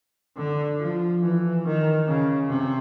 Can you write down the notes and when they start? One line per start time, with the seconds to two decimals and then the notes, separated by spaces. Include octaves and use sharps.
0.36 D3
0.79 F3
1.21 E3
1.65 D#3
2.07 C#3
2.49 C3